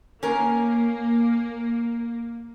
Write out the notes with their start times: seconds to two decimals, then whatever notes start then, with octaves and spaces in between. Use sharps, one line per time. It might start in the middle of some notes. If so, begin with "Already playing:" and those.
0.23 A#3 C#4 A#4